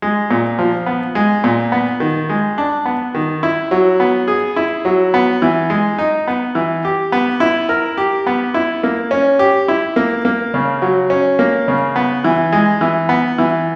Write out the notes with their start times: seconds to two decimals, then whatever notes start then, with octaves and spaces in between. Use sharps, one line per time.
0.02 G#3
0.31 A#2
0.59 F3
0.86 B3
1.15 G#3
1.44 A#2
1.72 B3
2.00 D#3
2.29 G#3
2.58 D4
2.85 B3
3.15 D#3
3.43 E4
3.71 F#3
4.00 B3
4.28 G#4
4.56 E4
4.85 F#3
5.14 B3
5.42 E3
5.70 G#3
5.98 D#4
6.28 B3
6.55 E3
6.85 G4
7.12 B3
7.40 E4
7.69 A#4
7.97 G4
8.27 B3
8.54 E4
8.83 A#3
9.11 C#4
9.39 G4
9.68 E4
9.96 A#3
10.25 A#3
10.54 C#3
10.82 F#3
11.10 C#4
11.39 A#3
11.68 C#3
11.96 B3
12.24 E3
12.52 G#3
12.81 E3
13.09 B3
13.38 E3